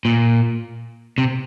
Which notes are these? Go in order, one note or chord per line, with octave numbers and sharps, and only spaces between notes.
A#2
C3